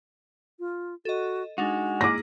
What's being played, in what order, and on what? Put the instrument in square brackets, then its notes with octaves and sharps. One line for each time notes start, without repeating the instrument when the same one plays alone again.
[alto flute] F4
[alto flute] F#4 [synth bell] A4 D#5
[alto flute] G#3 [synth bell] D4 D#4 F7 [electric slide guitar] F#4
[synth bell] A#3 E4 G#4 [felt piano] D6 A#6